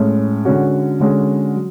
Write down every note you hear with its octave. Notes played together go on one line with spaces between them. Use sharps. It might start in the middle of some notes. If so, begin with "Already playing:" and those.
Already playing: A2 G#3 C#4
D3 G#3 C#4 F#4
D3 G#3 C#4 F#4
F#3